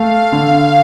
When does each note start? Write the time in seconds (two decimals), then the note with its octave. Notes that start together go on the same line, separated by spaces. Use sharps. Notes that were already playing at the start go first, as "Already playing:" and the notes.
Already playing: A3 F5
0.32 D3